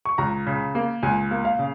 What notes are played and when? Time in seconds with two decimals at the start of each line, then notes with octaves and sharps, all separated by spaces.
0.05 C#6
0.18 C#2 A#5
0.47 C#3
0.75 A#3
1.03 C#2 G#5
1.31 A#3
1.45 F5
1.59 C#3